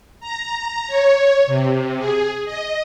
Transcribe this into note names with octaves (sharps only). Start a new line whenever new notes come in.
A#5
C#5
C3
G#4
D#5